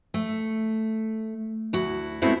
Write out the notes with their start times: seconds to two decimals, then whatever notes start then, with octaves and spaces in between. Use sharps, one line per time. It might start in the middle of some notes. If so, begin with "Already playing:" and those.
0.14 A3
1.73 D2 E4 F#4
2.22 G#3 A3 B3 C4 E4 F#4